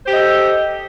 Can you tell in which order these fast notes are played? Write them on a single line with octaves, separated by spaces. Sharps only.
C5 G4 D#5 A4